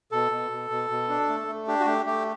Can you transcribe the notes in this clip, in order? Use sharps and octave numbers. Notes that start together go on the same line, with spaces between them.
B2 A4
B2
B2
B2
B2
D4
A3
A3
D4 G4
F#4
A3 G4
A3 G4